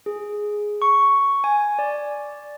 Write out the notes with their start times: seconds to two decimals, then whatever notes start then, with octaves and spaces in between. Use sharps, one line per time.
0.06 G#4
0.82 C#6
1.44 G#5
1.79 D5